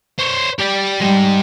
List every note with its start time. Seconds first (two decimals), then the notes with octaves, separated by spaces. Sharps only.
0.19 C5 C#5
0.59 G4 D5
1.01 G3 G#3 D#4